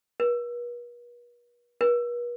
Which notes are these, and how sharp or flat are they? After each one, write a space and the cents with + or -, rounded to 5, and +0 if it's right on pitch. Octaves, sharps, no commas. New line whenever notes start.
B4 -45
B4 -45